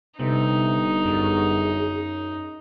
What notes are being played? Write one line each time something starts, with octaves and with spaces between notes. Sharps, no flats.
G1 C3 D#4
F#2 G#4